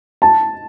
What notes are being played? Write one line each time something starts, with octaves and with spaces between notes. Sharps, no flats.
A5